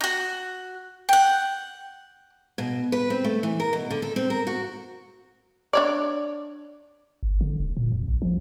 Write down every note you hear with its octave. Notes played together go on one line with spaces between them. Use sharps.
D#4 F#4
F#5 G5
B2
B4
C4
A3
E3
A#4
B2
D3
A4
C4
A#4
F#4
D4 C#5 D5
G1
D3
D#1
A#2
F2
A#1
F3